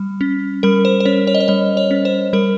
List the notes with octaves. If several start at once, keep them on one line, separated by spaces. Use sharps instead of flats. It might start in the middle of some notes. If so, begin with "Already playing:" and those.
Already playing: G3
C#4
G3 A#4
C5
C5
C#4 C#5
C#5
D#5
C#5
G3 D#5
C#5
C#4
C5
G3 A#4